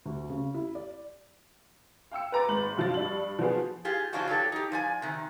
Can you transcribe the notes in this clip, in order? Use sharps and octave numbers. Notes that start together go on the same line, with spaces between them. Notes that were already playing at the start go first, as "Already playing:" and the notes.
D2
C#3
E4
D5
F5 G5 E6 C#7
B4 A#5 D6 A6
G#1 B4 F#7
F#2 F3 F5 A6
G2 D4 F#7
F3 F#3 B3 G#4
F4 G4 G#4
C#3 F3 D4 D#4 F4 F#4
F#3 G4 A4
D#4 G4
F3 D5 G#5
C3 D#3